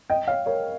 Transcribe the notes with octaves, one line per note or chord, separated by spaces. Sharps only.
D#5 G5
C#5 F5
A#4 C#5